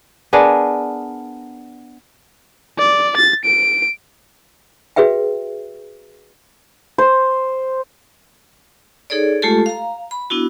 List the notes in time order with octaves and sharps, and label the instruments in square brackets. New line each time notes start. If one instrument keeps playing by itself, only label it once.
[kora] B3 D4 G#4 A#4
[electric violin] D5
A6
D7
[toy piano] F#4 G#4 B4 E5 G5
[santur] C5
[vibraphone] D#4 G#4 A4 C#5 D5
G#3 A3 F4 G4 A4
F5 A#5
B5
B3 D4 E4 F#4